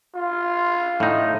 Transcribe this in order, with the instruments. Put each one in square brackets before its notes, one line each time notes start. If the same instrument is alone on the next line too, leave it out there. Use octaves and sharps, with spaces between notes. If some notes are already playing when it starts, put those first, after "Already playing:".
[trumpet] F4
[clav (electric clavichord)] A2 D#4